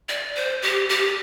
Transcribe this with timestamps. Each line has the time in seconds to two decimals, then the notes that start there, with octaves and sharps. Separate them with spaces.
0.09 D5
0.35 C5
0.62 G4
0.89 G4